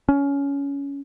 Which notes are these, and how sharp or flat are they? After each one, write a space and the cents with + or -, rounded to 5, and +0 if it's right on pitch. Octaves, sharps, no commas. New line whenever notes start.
C#4 +20